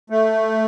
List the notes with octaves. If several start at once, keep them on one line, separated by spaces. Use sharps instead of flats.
A3